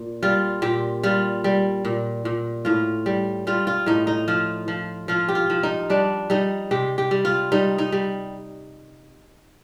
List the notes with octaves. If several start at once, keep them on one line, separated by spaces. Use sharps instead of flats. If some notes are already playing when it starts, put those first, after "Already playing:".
Already playing: A#2
G3 F4
A#2 G4
G3 F4
G3
A#2
A#2
A2 F4
G3
G3 F4
F4
A2 D#4
D#4
F3 F4
F3
F3 F4
G4
F4
F3
D#4
G3 D4
G3 D#4
C3 G4
G4
G3
F4
G3 D#4
D#4
G3